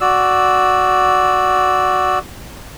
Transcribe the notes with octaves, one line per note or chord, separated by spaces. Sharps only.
F#4 D5 E6